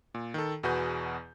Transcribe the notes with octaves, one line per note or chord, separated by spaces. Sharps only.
A#2
D#3 A4
E2 B2 F#4 G#4 B4 G6